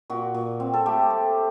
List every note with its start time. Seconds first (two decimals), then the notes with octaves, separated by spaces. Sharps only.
0.10 A#2 F#4
0.34 A#2
0.60 C4
0.73 A4
0.86 A3 G4
1.10 A3